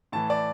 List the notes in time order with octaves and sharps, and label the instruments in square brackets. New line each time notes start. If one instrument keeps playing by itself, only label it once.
[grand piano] A2 E3 A5
D5